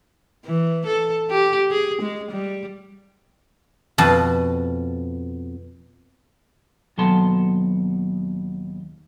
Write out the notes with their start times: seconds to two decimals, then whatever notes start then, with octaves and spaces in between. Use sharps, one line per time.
0.46 E3
0.86 A4
1.31 G4
1.71 G#4
2.02 G#3
2.31 G3
3.98 F2 B2 A5
6.98 D#2 B2 F#3 A4 A5 C6